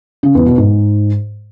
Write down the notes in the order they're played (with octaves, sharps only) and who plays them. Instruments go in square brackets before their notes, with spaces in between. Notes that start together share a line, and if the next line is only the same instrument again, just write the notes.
[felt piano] C#3
E2
B2
G#2